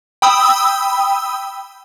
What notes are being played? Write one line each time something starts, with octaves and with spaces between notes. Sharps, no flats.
G5 B5 D#6 E6